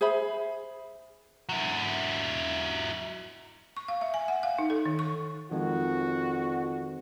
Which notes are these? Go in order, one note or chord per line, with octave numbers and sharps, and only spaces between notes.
G#4 C5 E5 B5
F#3 E4
C#6
F5
E5
G#5
F#5
F5
D#4
A4
D#3
C#6
F2 D#3 F3 G#3 F#4